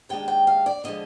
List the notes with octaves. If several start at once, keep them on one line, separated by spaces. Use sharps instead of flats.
D#2 D#3 G#3 D4 G5
G5
F5
D5
D3 F3 G#3 D#5